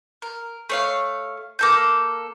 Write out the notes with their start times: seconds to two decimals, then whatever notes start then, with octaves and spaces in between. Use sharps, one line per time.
0.22 A#4
0.69 A3 C#5 F5
1.59 A#3 A4 G6